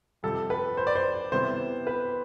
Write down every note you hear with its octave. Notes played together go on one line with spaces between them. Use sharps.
F2 C3 G3 A4
B4
C5
D5
C5
C3 G3 B3 E4 C5
B4